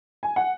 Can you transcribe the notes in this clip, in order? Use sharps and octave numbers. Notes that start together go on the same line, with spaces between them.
G#5
F#5